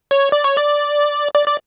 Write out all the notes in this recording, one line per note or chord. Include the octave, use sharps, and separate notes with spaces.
C#5
D5
C#5
D5
D5
D5